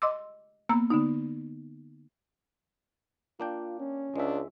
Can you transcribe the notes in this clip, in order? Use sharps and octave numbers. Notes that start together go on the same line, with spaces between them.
D#5 C6 D6 E6
A#3 B3 A#5 E6
D3 B3 D#4
A#3 D4 F4 G5
C#4
C#2 G#3 D4 E5